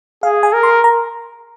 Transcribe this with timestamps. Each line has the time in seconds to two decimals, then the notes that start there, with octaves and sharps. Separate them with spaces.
0.23 G#4 F5
0.43 G#5
0.53 A#4
0.63 C6
0.84 A#5